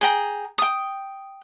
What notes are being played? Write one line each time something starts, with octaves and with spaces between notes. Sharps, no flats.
G#4 G5 A#5
G5 D#6